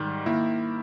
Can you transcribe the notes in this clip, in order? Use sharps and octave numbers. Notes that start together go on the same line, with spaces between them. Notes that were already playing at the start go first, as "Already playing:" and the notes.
Already playing: G#2 D#3 G3
D#3 A#3 E4 A#4